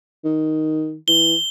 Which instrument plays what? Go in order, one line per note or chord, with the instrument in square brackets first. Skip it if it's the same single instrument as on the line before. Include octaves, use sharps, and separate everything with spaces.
[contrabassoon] D#3
[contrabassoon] E3 [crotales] G7